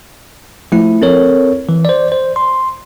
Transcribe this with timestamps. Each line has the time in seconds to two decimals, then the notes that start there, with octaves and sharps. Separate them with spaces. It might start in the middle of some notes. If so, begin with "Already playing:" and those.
0.72 F3 A3 E4
1.02 C4 A4 A#4 C#5
1.69 E3
1.85 C5 D5
2.12 C5
2.36 C6